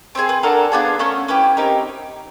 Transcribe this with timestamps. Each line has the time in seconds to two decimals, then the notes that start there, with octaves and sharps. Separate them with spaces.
0.15 C4 D#4 G#4 C5
0.29 B4
0.43 D4 F#4 A4 A#4
0.72 B3 D4 F4 G#4
0.99 A3 C#4 F#4 A#4
1.28 C#4 E4 G4 B4
1.57 C4 D#4 G4 A#4